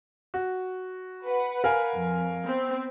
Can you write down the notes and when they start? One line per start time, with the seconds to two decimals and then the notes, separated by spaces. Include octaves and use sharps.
0.34 F#4
1.25 B4 F#5
1.64 A#4 F5 G#5
1.94 F2
2.46 B3 C4